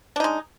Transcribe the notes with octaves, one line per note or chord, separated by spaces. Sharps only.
G#3 D4 D#4